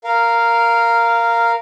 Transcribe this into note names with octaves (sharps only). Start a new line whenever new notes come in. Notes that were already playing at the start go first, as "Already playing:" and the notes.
A#4 F5